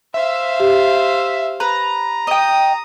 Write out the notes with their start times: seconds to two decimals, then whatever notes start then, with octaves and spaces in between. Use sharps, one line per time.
0.14 C5 E5 F5
0.60 G4
1.60 B4 A#5
2.27 D#5 G5 D#6